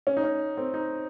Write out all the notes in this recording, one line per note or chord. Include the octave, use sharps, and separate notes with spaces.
C#4
D#4
C#4
C4
D#4